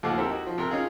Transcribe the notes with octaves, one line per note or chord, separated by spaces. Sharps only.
D#2 F3 A3 F5 F#5 D6
C4 E4 G4 A4 A#4
D#4 F#4
F3
C3 A#4
C#4 D#4 F4 G#4